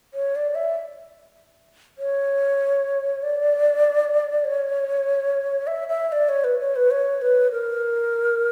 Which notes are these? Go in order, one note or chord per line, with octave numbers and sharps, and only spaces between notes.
C#5
D5
E5
C#5
D5
C#5
E5
E5
E5
D5
C#5
B4
C#5
B4
C#5
B4
A#4